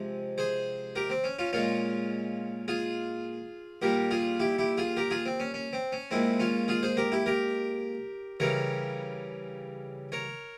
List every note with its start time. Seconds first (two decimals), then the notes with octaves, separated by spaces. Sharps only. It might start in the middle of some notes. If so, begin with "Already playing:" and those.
Already playing: C3 F3 G#3
0.38 G#4 C5
0.96 G4 A#4
1.10 C4
1.24 C#4
1.39 C#4 F4
1.53 A#2 G#3 C#4 F4
2.68 F4 G#4
3.82 A#2 G3 G4 A#4
4.11 F4 G#4
4.40 E4 G4
4.58 E4 G4
4.78 F4 G#4
4.97 G4 A#4
5.11 F4 G#4
5.26 C4
5.40 C#4
5.54 C#4
5.73 C4
5.92 C#4
6.11 A#2 G#3 C4 E4
6.40 C#4 F4
6.68 F4 G#4
6.83 G#4 C5
6.97 G4 A#4
7.12 E4 G4
7.26 G4 A#4
8.40 C#3 E3 G3 A#4 C#5
10.12 A#4 C#5